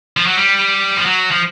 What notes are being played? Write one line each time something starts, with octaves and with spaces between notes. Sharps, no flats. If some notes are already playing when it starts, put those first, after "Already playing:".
F3
F#3
G3
F3
F#3
F3